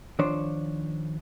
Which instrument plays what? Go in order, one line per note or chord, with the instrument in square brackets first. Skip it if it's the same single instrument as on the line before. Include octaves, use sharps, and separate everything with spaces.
[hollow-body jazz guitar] D#3 F3 D4 C5 C#5